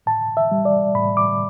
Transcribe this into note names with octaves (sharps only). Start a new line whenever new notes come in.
A2 A5
E5
G3
D5
A2 B5
D6